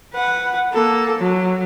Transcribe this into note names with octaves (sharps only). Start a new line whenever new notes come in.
B4 F#5
A#3 A4
F#3